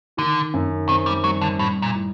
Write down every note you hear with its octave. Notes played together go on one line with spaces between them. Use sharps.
D3 D#3
F#2
D#3 C4
G3
F#3 G3
D3
A2 G3
A#2
A2